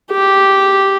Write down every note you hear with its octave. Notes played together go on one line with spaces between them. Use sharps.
G4